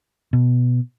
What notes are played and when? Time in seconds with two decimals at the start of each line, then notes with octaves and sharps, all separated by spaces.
0.33 B2